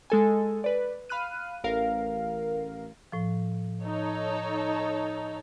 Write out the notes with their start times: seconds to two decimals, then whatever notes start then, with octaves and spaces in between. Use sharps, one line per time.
0.10 G#3 A4 G#5
0.64 B4 D5
1.09 F5 B5 F6 F#6 D#7
1.64 A1 A#4 F5
3.12 A2 F3
3.83 D#4 A4 C#5